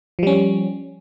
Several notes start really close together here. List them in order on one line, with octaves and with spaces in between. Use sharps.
F3 G3 C#4